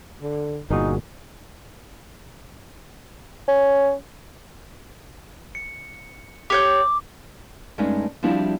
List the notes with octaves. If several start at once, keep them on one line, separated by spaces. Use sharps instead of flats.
D3
G1 A#2 D#4 F#4 G#4 A#4
C#4
C#7
G4 C#5 D6 G6
G2 G#3 A3 C#4 D#4
F3 G3 C4 D4 E4 F#4